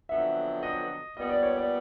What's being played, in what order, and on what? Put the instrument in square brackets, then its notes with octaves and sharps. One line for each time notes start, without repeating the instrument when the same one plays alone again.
[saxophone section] F2 D3 F#3 B3 [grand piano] E5
[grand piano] D#5
[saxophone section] A#2 G3 B3 [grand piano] D#5
[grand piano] D5
C#5
D5